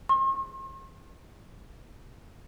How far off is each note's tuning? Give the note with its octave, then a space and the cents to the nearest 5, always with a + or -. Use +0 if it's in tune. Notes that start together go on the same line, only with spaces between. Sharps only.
C6 +45